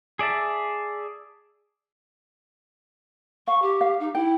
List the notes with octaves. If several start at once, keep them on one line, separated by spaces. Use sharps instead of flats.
G#4 D5 E5 A5
F5 C#6
G4
F5
D#4
E4 G5